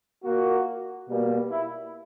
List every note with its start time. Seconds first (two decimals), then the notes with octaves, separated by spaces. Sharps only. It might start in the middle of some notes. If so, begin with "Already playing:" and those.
0.24 A#2 A#3 F#4
1.09 B2 G3 A#3
1.50 E4